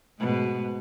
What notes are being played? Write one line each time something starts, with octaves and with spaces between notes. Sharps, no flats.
G#2 B2